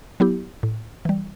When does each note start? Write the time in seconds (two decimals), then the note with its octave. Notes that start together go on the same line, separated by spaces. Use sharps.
0.20 F#3 B3 E4 G4
0.63 A2
1.05 E3 G3